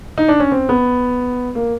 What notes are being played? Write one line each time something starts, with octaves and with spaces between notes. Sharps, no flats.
D#4
D4
C#4
C4
B3
A#3